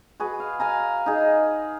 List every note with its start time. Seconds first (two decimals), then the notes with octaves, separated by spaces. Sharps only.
0.20 F#4 G#4 B4
0.40 F5
0.60 F5 G#5 A#5
1.06 D#4 G#4